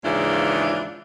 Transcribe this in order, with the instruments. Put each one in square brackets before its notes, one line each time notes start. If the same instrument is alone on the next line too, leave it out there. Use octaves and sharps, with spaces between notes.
[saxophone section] D#2 G#2 C#3 E3 D4 F4